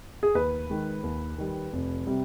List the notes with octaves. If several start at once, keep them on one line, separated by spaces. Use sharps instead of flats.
G#4
D#2 B4
D#3 G#3
D#2
D#3 G3
F1
C3 G3